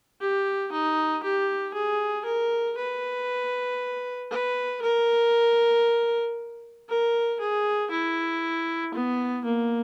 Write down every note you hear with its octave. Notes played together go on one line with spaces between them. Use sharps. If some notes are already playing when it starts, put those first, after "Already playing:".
G4
D#4
G4
G#4
A#4
B4
B4
A#4
A#4
G#4
E4
B3
A#3